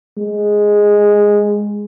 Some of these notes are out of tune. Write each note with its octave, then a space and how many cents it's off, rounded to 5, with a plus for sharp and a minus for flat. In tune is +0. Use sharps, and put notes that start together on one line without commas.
G#3 -5